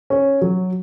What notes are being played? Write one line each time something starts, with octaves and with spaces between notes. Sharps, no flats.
C#4
F#3